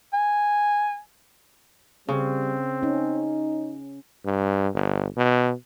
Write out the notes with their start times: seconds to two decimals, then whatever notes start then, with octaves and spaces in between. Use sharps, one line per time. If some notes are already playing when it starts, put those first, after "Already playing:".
0.13 G#5
2.09 C#3 G3 C4
2.83 C#4 D#4
4.25 G2
4.74 G1
5.17 B2